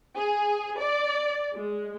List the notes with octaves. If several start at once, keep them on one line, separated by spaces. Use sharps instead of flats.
G#4
D5
G#3